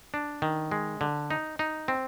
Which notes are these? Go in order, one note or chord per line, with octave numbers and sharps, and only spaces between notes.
D4
D#3
G#3
D3
D#4
D#4
C4